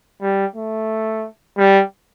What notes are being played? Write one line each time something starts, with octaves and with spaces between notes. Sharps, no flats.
G3
A3
G3